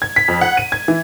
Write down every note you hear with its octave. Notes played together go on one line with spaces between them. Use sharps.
G#6
B6
F2
F#5
D#7
G#6
E3